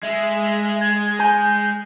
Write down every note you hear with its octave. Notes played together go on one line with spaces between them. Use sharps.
G#3 E5
G#6
G#5 G6